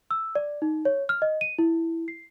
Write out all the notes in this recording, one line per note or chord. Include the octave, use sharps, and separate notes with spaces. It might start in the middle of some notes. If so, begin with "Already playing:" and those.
E6
D5
D#4
C#5
F6
D#5
D#7
E4
C7